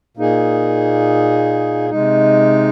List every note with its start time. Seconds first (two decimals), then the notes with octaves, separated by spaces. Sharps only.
0.17 A#2 A#3 D#4 G#4
1.90 C3 G#3 D#4